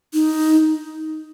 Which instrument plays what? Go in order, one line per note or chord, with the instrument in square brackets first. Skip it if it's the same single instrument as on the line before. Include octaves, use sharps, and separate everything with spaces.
[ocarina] D#4